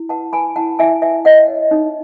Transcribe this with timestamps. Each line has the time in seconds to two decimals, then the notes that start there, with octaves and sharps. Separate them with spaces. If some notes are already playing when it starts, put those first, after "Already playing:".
Already playing: E4
0.09 B4 F#5 A5
0.33 B4 G#5 B5
0.56 E4 F#5 A5
0.79 E4 E5 G#5
1.02 B4 E5 G#5
1.25 B4 D#5 F#5
1.48 C#5
1.71 D#4